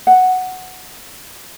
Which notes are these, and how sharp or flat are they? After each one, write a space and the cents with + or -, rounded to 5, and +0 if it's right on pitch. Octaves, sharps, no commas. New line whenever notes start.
F#5 +0